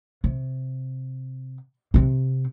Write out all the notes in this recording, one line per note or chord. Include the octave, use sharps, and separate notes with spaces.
C3
C3 C4